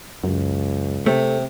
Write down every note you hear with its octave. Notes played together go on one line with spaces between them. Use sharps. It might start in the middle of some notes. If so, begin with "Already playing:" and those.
C#2 F#2
C3 A3